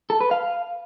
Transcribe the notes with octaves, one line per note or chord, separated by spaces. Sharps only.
A4
B4
F5